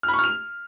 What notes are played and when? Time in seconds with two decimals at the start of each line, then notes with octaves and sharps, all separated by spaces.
0.03 F6
0.08 B5
0.14 C#6
0.19 F6
0.24 F7